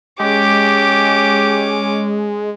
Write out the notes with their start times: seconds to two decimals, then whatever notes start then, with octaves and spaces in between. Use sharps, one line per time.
0.20 G#3 C#4 G4 D6